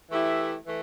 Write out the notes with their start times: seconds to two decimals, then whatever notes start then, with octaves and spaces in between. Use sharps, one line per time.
0.11 E3 A3 E4 G4
0.67 E3 A3